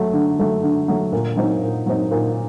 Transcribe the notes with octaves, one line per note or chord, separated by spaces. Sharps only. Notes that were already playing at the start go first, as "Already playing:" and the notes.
Already playing: F#3 A3
D3
F#3 A3
D3
F#3 A3
A#2
F#3 C4 D#4
A#2
F#3 C4 D#4
A#2